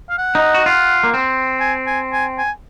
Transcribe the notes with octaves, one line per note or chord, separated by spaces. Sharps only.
F5
F#5
D#4
F#4
F4
A#3
C4
G#5
G#5
G#5
G#5